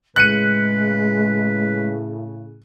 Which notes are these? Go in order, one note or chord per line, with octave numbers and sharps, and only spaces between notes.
A2 C#3 G#3 B4 F#6 C#7 D#7